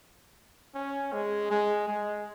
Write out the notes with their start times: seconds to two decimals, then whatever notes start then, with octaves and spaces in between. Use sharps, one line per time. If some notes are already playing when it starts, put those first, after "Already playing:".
0.75 C#4
1.13 G#3
1.50 G#3
1.88 G#3